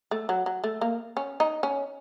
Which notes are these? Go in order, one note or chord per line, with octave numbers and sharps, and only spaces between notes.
A3
F#3
F#3
A3
A#3
C#4
D#4
C#4